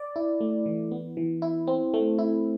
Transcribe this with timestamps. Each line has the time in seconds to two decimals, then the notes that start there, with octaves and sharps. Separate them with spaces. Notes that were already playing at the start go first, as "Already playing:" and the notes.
Already playing: D5
0.16 E4
0.41 A3
0.66 E3
0.91 B3
1.17 E3
1.42 E4
1.67 C4
1.94 A3
2.19 E4